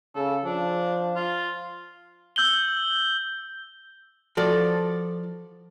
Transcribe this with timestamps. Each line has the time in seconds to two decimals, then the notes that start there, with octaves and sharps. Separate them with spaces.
0.15 C#3 A4
0.45 F3 D4
1.16 F4
2.36 E6 G6 F#7 G7
4.37 F3 F#4 A4 D5